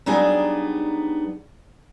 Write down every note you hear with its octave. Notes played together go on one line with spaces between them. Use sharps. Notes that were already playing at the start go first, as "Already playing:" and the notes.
F#3 G3 B3 D4 D#4 G#4